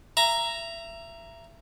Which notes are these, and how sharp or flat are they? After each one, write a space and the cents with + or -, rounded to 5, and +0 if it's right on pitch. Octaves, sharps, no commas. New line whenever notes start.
E5 +25 A#5 +0